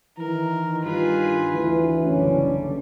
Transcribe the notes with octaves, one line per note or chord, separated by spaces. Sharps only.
D#3 E3 A#4
G2 F4 G#4 B4
D2 E3
F#1 B1 D3 G3 C#4